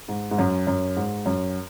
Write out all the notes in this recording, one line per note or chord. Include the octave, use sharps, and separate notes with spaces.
G#2
G#2
F#2
F#2
G#2
F#2